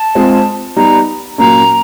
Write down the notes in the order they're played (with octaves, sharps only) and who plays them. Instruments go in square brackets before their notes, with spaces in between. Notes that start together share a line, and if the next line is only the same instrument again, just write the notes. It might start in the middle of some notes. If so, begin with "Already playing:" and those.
Already playing: [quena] A5
[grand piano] G#3 C4 F4 G#4
[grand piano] G3 B3 D#4 [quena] A#5
[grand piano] A#2 F#3 A#3 C#4 [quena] A#5